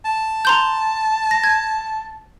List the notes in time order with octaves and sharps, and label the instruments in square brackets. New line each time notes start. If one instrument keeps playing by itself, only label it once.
[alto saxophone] A5
[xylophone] A#5 C6 G6
A#6
G#6